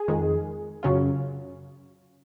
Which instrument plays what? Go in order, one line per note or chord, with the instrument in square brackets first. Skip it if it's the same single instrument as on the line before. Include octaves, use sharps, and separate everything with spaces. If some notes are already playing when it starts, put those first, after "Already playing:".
Already playing: [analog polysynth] G#4
F2 D#3 G#3
F#2 C#3 F#3 C#4 F4